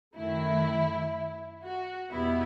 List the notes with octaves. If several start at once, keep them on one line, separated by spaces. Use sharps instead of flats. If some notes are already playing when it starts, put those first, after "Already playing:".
F#2 D#3 A3 E4
F#4
E2 B2 G3 B3 E4